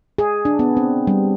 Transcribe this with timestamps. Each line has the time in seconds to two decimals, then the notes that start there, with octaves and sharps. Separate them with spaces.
0.18 G#4
0.45 D4
0.59 B3
0.77 C4
1.07 G3